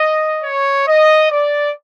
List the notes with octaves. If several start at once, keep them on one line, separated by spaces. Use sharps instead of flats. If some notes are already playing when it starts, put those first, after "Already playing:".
Already playing: D#5
C#5
D#5
D5